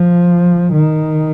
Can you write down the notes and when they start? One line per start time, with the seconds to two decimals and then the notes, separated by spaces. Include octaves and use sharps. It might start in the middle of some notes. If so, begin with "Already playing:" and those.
Already playing: F3
0.73 D#3